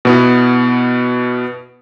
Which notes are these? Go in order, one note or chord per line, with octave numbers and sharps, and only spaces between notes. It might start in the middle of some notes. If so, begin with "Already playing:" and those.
B2 B3 E4